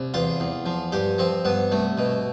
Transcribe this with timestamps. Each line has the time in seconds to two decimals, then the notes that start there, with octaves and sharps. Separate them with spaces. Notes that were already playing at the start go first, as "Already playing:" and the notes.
Already playing: C2
0.14 E2 F4
0.40 E2
0.66 F3
0.92 G2 G4
1.18 F3 C4
1.45 G2 B3
1.71 C2 A3
1.98 B2